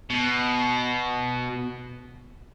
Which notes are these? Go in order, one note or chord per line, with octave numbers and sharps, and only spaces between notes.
B2